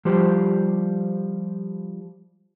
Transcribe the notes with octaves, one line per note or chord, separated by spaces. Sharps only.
F3 G3 G4 C5